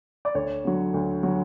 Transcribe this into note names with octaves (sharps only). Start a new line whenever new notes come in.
D5
D2 C#5
D3 F#3
D2
D3 F#3